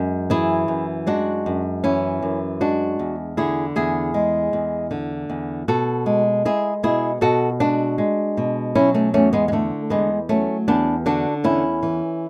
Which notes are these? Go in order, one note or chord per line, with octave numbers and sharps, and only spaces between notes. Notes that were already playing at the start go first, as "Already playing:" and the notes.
Already playing: F#2 G#3
E3 E4 G#4
F#2
G#3 D4 F#4
F#2
E3 C#4 E4
F#2
G#3 D4 F#4
E2
D3 E4 G#4
E2 E4 G#4
G#3
E2
D3
E2
B2 F#4 A4
G#3
G#3 E4 G#4
B2 E4 G#4
B2 F#4 A4
G#3 D4 F#4
G#3
B2
F#3 C#4 E4
A3 C#4
E2 A3 C#4
G#3 B3
G#3
D3 A3
E2 G#3 B3
F#3 A3 C#4
E2 B3 D4
D3 D4 F#4
E2 C#4 E4
E3